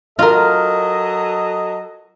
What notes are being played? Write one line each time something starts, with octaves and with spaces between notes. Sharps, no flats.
F#3 F4 A4 A#4 D#5